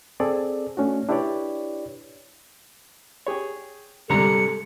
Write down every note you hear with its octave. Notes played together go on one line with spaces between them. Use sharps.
C4 G#4 A4 D5
A3 C#4 D4 F#4
D4 E4 G4 B4 C#5 D5
G4 G#4 C#5
C2 G#2 D3 G3 G4 A4 A#5 C#7